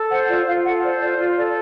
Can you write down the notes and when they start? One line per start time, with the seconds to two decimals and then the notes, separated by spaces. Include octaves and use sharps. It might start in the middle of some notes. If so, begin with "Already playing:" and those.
Already playing: A4
0.10 C5 F#5
0.28 F4 D5
0.46 F4 F5
0.64 A4 F#5
0.82 C5 D5
1.00 F4 D5
1.18 F4 D5
1.36 A4 D5